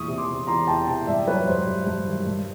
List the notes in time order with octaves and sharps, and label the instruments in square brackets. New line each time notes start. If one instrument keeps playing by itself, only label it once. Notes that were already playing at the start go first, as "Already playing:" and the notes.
Already playing: [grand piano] E2 A#2 C#6 D#6
C3
C6 D6
C3
E2 A#5 C6
E2 G5 A5
C3 G5 A5
G2 D5 E5
F#3 B4 C#5
G2 C5
G2
G2
D#3
G2